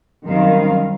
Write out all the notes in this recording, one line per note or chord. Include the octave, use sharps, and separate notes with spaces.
F#2 D#3 G3 C4 F5